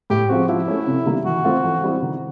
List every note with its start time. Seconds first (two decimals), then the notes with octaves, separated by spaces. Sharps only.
0.10 A2 G4
0.29 F3 G#3 C4 F#4
0.48 F3 E4
0.68 A3 C#4
0.87 C3
1.06 D#3 G3 A#3
1.25 E3 F#4
1.45 A3 C4 F4
1.64 E3
1.83 G3 C4 E4 G4
2.02 D#3